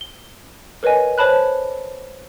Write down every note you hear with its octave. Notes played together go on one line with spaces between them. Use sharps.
G7
A#4 B4 C#5 D#5 G#5
C5 C#5 A5 B5 F#6